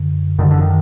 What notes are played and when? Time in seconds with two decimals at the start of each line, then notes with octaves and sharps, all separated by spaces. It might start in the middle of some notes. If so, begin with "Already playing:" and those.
Already playing: F#2 D3
0.39 F#2 D3 D#3
0.51 D3
0.62 D#3